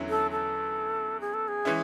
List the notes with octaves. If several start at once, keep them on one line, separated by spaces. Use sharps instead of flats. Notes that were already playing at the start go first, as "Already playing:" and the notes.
Already playing: E2 D3 F#3 C#4 E4
A4
A4
G#4
A4
G#4
E3 G#3 C#4 E4